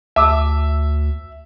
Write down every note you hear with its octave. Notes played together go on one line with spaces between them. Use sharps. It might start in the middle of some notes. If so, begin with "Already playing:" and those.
D2 E5 A5 D6 E6